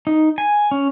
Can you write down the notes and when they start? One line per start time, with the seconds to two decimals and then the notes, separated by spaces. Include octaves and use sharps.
0.07 D#4
0.38 G#5
0.71 C#4